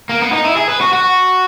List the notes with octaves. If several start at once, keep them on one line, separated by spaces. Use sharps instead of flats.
A#3
B3
D#4
E4
G#4
B4
F#4
F#4